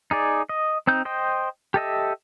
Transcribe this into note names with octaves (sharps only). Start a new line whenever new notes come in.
D#4 G#4 D5
D#5
C4 D#4 G6
C5 D#5 G5
G4 A4 D#5 E5